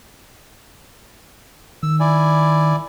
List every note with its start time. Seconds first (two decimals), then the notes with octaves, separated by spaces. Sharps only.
1.83 D#3 E6
2.00 E4 D5 G#5